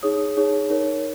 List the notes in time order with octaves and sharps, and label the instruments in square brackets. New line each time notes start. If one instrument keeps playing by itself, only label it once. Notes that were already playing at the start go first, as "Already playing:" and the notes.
[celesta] D#4 G#4 C#5 D#6
D#4 G#4 C#5
D#4 A#4 C#5